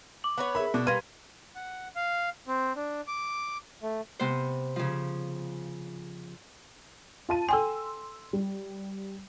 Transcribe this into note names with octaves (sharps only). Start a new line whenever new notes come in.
D6 F#7
B3 B4 C#5
G#4 A#4 E5 B5
B2 D4
G3 A#3 B4 C6 G#6 D#7
F#5
F5
C4
D4
D6
A3
C3 B3 C4 C5
C#3 F3
F4 A5 D#7
A4 G5 G#5 C6 E6
G3